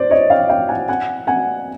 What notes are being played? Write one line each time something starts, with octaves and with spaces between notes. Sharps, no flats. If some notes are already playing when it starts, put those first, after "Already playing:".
Already playing: C5 D5
C#5 D#5
F5 G5
F5 G5
F#5 G#5
F#5 G#5
F#5 G#5